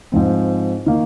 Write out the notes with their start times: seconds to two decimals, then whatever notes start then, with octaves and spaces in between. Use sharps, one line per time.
0.12 G#2 F3 C4
0.86 D#3 A#3